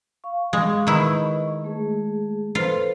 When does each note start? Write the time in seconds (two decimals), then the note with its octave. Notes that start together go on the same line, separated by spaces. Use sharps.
0.24 F5 C#6
0.53 G#3
0.87 D#3 E4 B4 D#5 C#6
1.63 G#3 A3 G#4
2.55 F4 A4 B4 C5